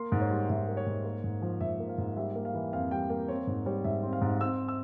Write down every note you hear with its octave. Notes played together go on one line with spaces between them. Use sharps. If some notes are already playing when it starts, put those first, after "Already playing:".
Already playing: A#3 C6
G#2
C#5
G3
G#2 E5
A#3
C#5
G#2
A#3
G#2
F3
G#2 E5
A#3
F5
G#2
G3 E5
A#3
F5
E3
F2 F5
G3 G5
A#3 F5
C4 C#5
G#2
G3 C#5
G#2 E5
C4
F5
G#2
C4 E6
E6